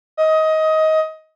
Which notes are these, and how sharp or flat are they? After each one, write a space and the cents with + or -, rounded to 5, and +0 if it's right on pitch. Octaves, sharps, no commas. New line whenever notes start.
D#5 +20